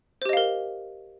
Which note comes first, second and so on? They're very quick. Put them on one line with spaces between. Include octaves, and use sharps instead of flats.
C5 G4 D#5 F5 A#4